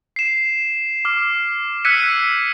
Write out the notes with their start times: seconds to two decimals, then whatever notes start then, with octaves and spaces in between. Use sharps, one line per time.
0.16 C7 E7
1.05 D6 F6
1.85 E6 F#6 G#6 B6 C#7 D#7